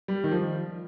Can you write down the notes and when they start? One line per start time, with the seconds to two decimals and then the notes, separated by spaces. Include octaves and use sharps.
0.08 G3
0.24 D#3
0.31 F3